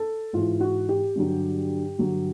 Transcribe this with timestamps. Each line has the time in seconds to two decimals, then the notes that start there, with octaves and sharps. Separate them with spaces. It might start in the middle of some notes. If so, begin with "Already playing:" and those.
Already playing: A4
0.33 G#2 E3 F4
0.60 F#4
0.89 G4
1.15 G2 D3 F#3
1.98 G2 D3 F#3